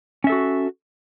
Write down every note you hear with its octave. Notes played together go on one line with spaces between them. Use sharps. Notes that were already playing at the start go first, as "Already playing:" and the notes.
C#4 F#4 A4 E5